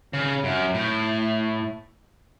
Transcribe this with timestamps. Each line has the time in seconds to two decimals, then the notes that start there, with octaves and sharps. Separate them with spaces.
0.13 C#3
0.44 F#2
0.74 A2